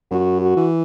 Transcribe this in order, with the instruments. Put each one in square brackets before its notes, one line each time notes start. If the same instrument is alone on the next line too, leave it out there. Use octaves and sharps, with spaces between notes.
[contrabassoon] F#2 [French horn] F#4
[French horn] F#4
[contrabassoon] E3